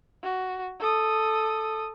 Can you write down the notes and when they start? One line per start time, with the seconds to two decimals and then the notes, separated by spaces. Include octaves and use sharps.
0.23 F#4
0.80 A4 D#6